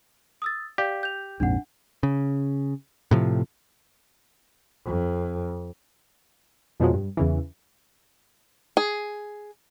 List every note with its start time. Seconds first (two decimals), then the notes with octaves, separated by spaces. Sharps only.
0.42 D#6 E6 A6
0.78 G4 D5 F5
1.03 G6 F7
1.40 A#1 F2 G#2 D4 F#5
2.03 C#3
3.11 A2 C3 F3
4.85 F2
6.80 F2 B2 F3 F#3 G#3
6.94 G2
7.17 E2 C#3 E3
8.77 G#4